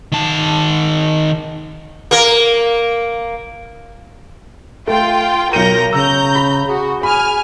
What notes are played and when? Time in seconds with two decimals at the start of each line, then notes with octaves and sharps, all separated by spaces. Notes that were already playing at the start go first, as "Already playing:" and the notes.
0.12 D#3 A5
2.11 A#3 A#4
4.87 A3 F4 G5
5.53 B1 A#4 G6 A#6 C#7 D#7
5.93 C#3 A#5 E6 G6
6.35 B5
6.67 F#4 G#4
7.03 G#5 B5 F6